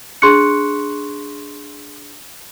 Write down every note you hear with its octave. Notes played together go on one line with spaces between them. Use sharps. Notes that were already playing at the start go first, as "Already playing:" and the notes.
D4 G#4 C6 C#6 F#6 C#7